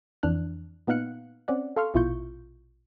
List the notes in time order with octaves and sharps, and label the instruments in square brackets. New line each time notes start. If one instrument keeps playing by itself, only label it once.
[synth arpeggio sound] F2 E3 D4 F6 F#6
A#2 B3 D#4 F5 F#6 C#7
C4 C#4 D5 F#5
A4 F5 C6 C#6 F6
A#1 B2 E4 F4 C#6 G6